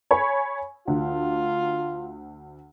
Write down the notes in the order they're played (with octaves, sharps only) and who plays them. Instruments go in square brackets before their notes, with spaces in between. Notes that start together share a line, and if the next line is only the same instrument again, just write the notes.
[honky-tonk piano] C#5 G#5 B5
[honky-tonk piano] D2 [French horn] F4